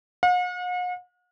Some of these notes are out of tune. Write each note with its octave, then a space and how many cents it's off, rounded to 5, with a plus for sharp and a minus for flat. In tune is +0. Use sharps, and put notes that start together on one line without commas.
F#5 -45